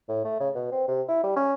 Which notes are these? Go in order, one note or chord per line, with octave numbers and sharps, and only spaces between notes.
A2
A3
C#3
B2
C4
C3
E4
G3
C#4